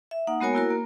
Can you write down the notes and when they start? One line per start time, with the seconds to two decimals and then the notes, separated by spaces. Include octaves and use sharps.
0.11 E5
0.27 A#3 D#4 F#5
0.40 G#3 B3 F#4 A#4 C#5 G#5
0.53 A#3 E4 F#4 A#4
0.70 A#3